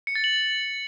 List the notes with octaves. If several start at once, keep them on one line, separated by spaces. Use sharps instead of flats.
C#7
A6
F#7